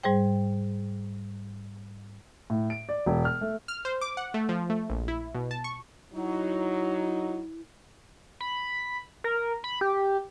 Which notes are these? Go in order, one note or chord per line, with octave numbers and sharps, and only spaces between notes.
G#2 G3 G#4 C5 G5
A2
D7
D5
E1
F6
A3
F6
C5
D6
F#5
A3
F3
A3
A#1
E4
B2
A5
C#6
F#3 D#4 E4
B5
A#4
B5
G4